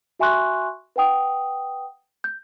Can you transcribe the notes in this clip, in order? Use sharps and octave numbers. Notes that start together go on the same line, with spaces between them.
F#4 E5 G#5 C6 C#6 F#6
B4 F#5 G5 D#6
G6